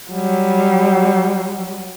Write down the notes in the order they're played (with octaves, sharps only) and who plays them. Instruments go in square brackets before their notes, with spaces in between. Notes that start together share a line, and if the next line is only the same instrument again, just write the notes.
[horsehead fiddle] F#3 G3